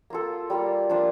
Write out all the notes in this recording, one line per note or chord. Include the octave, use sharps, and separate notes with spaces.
A#3 F4 A4
G3 A#3 F4
F3 A#3 D4 F4